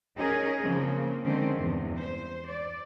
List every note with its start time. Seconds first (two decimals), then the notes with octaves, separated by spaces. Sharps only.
0.15 C#4 D#4 G#4 A#4
0.62 C#3 F3 A#3 C4
1.23 D3 D#3 G#3 C4 C#4
1.57 E2 G2 C3
1.98 C5
2.48 D5